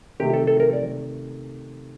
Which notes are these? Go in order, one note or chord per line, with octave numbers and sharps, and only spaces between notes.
C3 D#3 A3 G4
A4
A4
A#4
D5